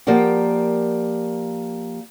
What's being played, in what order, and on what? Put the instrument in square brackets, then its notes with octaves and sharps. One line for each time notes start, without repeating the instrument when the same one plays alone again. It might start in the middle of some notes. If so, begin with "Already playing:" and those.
[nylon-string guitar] F3 A#3 G4 A#4 D5 F#5